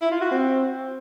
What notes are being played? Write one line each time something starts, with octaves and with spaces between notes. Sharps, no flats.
E4
F4
F#4
C4